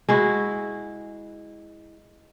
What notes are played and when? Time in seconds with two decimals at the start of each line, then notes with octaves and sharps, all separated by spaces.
0.09 G#3 E4 F#4